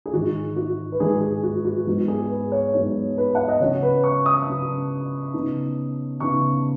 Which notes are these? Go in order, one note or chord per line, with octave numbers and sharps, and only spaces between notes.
G#4
G#2 D#3 G#3 D#4 F#4
F#4
B4
G#2 D#3 G#3 D#4 G#4
G#4
F#4
F#4
G#2 F#3 B3 D#4 F#4
G#4
B4
C#5
G#2 F#3 B3 D#4 C#5
B4
F#5
D#5
C#3 F#3 C#4 C#5
B4
C#6
D#6
C#3 F#3 C#4
C#3 B3 D#4
C#3 B3 D#4 C#6